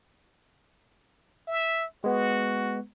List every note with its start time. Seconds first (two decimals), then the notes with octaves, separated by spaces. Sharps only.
1.48 E5
2.04 G#3 B3 F#4